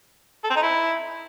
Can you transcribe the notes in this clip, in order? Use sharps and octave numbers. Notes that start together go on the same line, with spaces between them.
A4
C4
D#4
E4